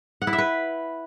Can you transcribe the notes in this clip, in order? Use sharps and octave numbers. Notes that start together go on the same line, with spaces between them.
F#5
E4
E5
B4